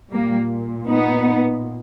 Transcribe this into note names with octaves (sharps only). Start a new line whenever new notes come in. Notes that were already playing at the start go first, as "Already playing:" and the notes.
A#2 G3 A#3
B3 D#4